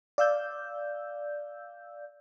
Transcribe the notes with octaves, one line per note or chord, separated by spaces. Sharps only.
D5 F5 E6 G6